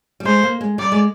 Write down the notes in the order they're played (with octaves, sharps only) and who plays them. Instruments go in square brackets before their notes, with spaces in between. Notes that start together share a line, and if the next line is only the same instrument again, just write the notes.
[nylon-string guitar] G3
[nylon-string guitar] G#3 [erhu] C5
[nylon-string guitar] A#3
G#3
[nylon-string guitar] G3 [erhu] D5
[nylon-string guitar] G#3